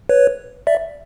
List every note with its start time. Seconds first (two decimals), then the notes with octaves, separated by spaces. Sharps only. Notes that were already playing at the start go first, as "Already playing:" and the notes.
0.09 B4 C#5
0.67 D5 E5